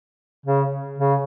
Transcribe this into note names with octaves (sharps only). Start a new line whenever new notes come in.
C#3
C#3